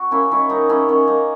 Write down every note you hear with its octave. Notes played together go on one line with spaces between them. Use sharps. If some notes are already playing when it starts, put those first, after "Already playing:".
Already playing: F#4
A#3 C#4 E4
D#3 C#4 E4
D#3 D#4
A#3 C#4 E4
D#3 C#4
A#3 D#4